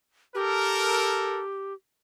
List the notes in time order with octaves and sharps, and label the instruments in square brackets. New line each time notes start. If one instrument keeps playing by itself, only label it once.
[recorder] G4 [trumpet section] A4 A#4